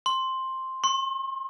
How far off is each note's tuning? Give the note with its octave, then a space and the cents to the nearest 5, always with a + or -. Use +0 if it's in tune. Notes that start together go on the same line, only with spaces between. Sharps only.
C6 +5
C6 +45